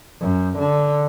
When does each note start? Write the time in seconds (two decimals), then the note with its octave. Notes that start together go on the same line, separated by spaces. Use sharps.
0.21 F#2
0.59 D3